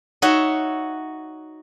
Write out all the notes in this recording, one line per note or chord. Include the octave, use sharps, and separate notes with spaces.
D#4 F#4 C#5 E5